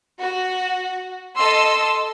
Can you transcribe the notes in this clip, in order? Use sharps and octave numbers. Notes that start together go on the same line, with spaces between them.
F#4
A4 D#5 C6 E6